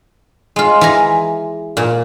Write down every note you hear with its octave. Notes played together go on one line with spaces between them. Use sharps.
G#3 F4
E3 G#5 A#5
A#2